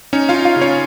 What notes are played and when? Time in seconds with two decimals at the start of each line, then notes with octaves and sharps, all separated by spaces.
0.13 C#4 D#4 C#5
0.29 F4 F5
0.35 D#4
0.45 F4 F5
0.56 C#3
0.61 C#4 C#5